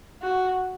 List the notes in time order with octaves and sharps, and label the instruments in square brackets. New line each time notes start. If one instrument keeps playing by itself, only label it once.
[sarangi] F#4